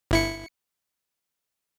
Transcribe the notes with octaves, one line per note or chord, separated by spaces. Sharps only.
G1 E4 C#7